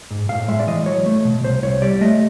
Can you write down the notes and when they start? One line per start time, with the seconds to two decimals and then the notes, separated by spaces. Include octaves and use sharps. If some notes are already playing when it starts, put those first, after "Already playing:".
0.11 G#2
0.29 A2 F5
0.48 G#3 E5
0.59 D5
0.67 E3 D#5
0.86 F#3 C#5
1.06 A3
1.25 B2
1.44 C2 C5
1.63 C2 C#5
1.82 G3 D5
2.01 A3 D#5